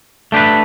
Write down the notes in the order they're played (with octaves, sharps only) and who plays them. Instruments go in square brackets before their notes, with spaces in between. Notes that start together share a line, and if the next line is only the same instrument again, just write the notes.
[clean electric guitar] A3 D4 G4 B4